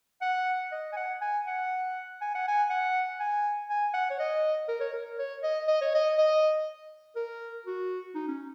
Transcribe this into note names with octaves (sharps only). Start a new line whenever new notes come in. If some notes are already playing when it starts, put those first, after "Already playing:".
F#5
D#5
G#5
F#5
G#5
F#5
G#5
F#5
G#5
F#5
G#5
G#5
F#5
C#5
D#5
A#4
C#5
A#4
C#5
D#5
D#5
C#5
D#5
D#5
A#4
F#4
D#4
C#4